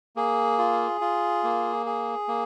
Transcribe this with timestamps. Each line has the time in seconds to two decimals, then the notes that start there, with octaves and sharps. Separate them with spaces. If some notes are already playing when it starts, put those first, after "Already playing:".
0.16 A#3 G#4
0.58 F4
1.01 F4
1.43 A#3
1.86 G#4
2.28 A#3